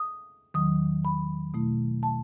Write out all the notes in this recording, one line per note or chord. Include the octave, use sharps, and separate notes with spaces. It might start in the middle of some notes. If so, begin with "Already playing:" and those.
Already playing: D#6
E2 D#3 F#3 D#6
B5
B2 A3 E4
A5